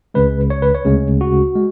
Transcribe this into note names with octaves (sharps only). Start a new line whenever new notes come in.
C#2 C#3 G#3 B4
C#5
B4
C#5
D2 C#3 G#3
F#4
G#3